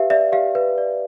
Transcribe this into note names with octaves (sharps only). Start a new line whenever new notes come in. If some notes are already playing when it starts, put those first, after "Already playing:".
Already playing: G4 B4 E5 F5
D5 E5
G4 F5
B4
D5